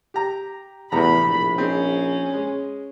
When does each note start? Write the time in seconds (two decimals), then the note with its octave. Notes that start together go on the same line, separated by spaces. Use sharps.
0.14 G4 A#5
0.92 E2 A2 C3 A#5 B5
1.25 A#1
1.58 C4 C#4 D#4 G#4
2.34 G#3